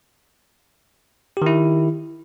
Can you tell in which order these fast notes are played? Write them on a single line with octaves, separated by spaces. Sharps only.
G4 D#3 E4